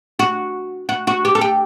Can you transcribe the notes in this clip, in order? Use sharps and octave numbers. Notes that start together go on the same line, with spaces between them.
F#4
F#4
F#4
G4
A4
G4